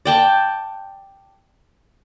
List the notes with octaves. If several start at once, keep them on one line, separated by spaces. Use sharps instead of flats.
D5 G5 A5